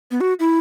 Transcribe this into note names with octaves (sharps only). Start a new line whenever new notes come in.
B3
F#4
E4